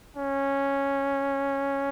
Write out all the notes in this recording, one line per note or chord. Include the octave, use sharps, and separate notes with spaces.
C#4